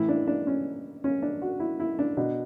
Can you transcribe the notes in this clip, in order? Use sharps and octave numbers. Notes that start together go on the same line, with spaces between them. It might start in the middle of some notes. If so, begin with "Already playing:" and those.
Already playing: A2 E3 E4
D4
D4
C#4
C#4
D4
F#4
E4
E4
D4
B2 D4